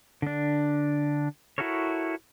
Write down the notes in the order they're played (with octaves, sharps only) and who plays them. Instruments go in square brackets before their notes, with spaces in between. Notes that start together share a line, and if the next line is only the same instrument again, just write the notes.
[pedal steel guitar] D3 D4
E4 F#4 A4 A#4 C#5